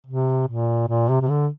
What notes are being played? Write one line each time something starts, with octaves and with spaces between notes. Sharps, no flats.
C3
A#2
A#2
C3
C3
D3